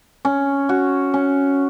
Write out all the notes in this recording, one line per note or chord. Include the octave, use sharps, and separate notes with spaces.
C#4
F#4
C#4